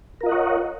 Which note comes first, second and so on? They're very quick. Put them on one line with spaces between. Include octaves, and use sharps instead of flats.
A#4 F4 D#5 F#5 C#5